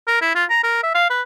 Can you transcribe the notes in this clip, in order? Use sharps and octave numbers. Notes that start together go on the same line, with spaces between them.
A#4
E4
F4
A#5
A#4
E5
F5
B4